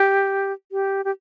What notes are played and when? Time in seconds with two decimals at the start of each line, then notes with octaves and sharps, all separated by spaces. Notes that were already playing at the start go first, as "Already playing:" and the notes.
Already playing: G4
0.72 G4
1.05 G4